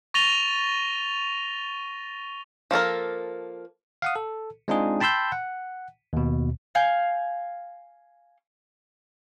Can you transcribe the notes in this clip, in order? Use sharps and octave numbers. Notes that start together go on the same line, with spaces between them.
C#6 A6 A#6 D#7 F7 G7
F3 A#3 A4 A#4
F5 F#5 D#6
A4
G#3 C4 D4 D#4 F4 G#4
G5 A5 B5 C6 E6 G6
F#5
D#2 B2
F5 G#5 G6